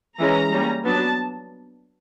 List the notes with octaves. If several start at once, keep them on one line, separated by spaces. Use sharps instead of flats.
E3 G#3 C#4 A#5
G3 A#3 C#4
F#3 B3 D4 A5